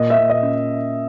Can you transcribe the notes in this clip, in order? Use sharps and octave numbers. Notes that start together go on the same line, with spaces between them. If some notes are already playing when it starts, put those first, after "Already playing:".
Already playing: A#2 D#5
E5
A#2
D#5
C#4